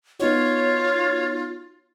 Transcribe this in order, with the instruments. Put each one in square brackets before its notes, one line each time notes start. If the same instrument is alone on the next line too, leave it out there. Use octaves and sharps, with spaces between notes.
[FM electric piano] B3 D#4 F#4 [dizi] F4 [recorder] C#5